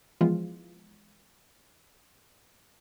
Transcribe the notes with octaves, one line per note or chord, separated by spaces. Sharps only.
E3 F3 G#3 B3 F4